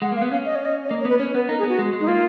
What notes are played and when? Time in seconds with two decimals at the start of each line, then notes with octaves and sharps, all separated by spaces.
0.02 G#3 F#5
0.12 A#3
0.16 F5
0.22 B3
0.31 C#4 F5
0.45 D#5
0.55 C#5
0.65 D#5
0.85 C#5
0.90 A#3 D#5
1.01 C#5
1.05 B3 B4
1.19 C#4 C#5
1.34 B3 B4
1.49 D#4 A#4
1.59 G#4
1.63 B3
1.69 F#4
1.79 G#3
1.93 G#3
2.00 D#4
2.07 A#3 F4